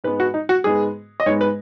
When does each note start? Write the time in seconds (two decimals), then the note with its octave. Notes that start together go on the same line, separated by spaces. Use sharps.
0.04 G#2 G#3 B3 B4
0.20 F#4
0.34 D#4
0.49 F#4
0.64 G#2 G#3 B3 G#4
1.20 D#5
1.26 G#2 G#3 B3 C#5
1.41 B4